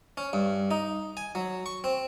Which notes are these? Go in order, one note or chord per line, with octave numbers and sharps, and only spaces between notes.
C#4
G2
D#4
G#5
F#3
C#6
C4